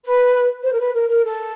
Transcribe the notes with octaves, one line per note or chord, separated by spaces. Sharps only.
B4
C5
A#4
B4
A#4
A#4
A4